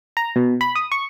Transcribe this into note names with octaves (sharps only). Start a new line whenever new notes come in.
A#5
B2
B5
D#6
C#6